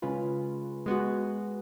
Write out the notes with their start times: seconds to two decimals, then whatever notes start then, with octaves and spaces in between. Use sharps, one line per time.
0.02 C#3 G#3 C#4 F4 B4
0.86 G#3 B3 F#4